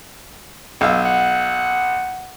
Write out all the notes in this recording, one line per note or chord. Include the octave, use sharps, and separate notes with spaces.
B1 F5 E6
F#5